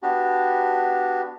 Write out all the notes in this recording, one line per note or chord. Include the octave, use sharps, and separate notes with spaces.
B3 D4 F#4 G4